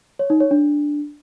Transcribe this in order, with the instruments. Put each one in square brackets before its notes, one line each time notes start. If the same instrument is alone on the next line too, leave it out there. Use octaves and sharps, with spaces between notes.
[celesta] C#5
D#4
C#5
D4